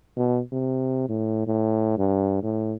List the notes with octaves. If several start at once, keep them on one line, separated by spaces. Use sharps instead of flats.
B2
C3
A2
A2
G2
A2